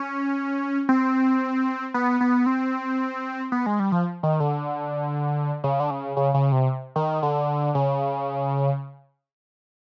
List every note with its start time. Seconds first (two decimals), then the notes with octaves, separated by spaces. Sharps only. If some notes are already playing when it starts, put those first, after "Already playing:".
Already playing: C#4
0.89 C4
1.94 B3
2.21 B3
2.46 C4
3.52 B3
3.66 G#3
3.80 G3
3.92 F3
4.23 D#3
4.40 D3
5.64 C#3
5.80 D3
5.90 C#3
6.17 C#3
6.34 C#3
6.52 C3
6.96 D#3
7.23 D3
7.75 C#3